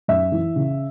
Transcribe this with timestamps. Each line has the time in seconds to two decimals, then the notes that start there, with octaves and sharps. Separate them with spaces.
0.08 F#2 E5
0.32 E3
0.56 C#3